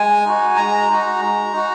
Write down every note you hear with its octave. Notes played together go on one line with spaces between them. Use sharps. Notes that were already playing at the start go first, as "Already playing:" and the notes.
Already playing: G#3 G#5
D#4 F#4
G#3 A#5
D#4 F#4
G#3
D#4 F#4